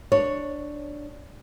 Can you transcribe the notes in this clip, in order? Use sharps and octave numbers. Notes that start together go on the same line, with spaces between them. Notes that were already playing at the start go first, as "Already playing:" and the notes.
D4 C#5